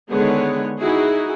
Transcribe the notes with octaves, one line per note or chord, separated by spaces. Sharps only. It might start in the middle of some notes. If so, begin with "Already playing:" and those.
D3 D#3 G#3 B3 G#4 C#5
D#4 E4 F#4 G#4